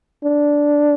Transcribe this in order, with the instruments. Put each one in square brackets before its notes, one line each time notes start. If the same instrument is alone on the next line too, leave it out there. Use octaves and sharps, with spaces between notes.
[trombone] D4